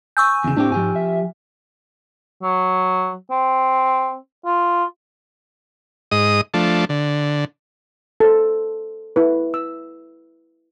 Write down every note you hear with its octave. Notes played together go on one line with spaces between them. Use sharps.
G#5 C#6 E6 G6
E2 C#3
A2 C4 D4 G4
G#2 F3 G4 G#5
E5
F#3
C4
F4
G#2 D#5 D#6
F3 A3 D4
D3
A4 C5
E4 B4
E6